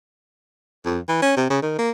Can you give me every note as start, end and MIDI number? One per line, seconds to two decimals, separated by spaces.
0.85 0.99 41
1.08 1.19 52
1.22 1.36 61
1.37 1.48 48
1.50 1.60 49
1.62 1.74 51
1.79 1.91 58